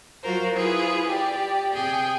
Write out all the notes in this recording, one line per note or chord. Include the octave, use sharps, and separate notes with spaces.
F#3 F4 F#4 A#4 C5
E4 F4 G#4 B4
G4 D5
C3 G#4 G5